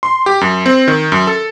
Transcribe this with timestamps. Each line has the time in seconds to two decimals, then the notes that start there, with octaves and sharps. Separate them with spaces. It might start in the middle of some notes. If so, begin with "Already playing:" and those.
0.03 C6
0.26 G4
0.41 F#2
0.66 C4
0.88 D#3
1.12 F#2
1.27 A4